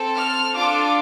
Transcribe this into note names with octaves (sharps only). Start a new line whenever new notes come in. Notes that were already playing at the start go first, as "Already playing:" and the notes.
Already playing: C4 A4
F6
D4 F4 A4 D6